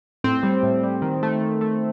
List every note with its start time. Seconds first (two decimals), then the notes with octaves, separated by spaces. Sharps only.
0.24 A2 C4
0.43 G3
0.63 A2
0.83 G3
1.02 D#3
1.23 A3
1.42 D#3
1.61 A3